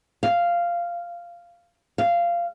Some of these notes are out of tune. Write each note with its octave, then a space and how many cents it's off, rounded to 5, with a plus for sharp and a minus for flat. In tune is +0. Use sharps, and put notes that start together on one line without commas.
F5 -10
F5 -15